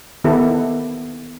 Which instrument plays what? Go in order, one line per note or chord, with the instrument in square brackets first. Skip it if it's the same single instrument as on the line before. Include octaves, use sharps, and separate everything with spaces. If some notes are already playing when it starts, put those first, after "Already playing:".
[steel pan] D#3 B3 E4 G4 A4